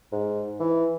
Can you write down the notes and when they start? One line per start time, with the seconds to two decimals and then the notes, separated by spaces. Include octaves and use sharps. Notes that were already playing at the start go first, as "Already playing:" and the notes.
0.12 G#2
0.60 E3